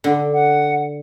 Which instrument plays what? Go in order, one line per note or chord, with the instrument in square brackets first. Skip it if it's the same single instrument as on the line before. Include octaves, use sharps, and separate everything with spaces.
[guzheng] D3
[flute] F#5